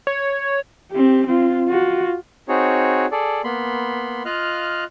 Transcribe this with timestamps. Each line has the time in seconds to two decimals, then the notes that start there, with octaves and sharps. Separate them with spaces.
0.07 C#5
0.92 C4 G4
1.27 C4 F4
1.68 F4 F#4
2.49 C4 D#4 F#4 G#4 C#5
3.12 G#4 A4 D5
3.44 A#3 B3 B5 C6
4.25 F4 D#5 F5 F6 F#6